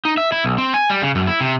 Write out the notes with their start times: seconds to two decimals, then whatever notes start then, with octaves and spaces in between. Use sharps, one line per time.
0.05 D#4
0.17 E5
0.32 E4
0.44 B1
0.58 C4
0.74 G#5
0.90 G3
1.02 C#3
1.15 F#2
1.27 E4
1.41 C3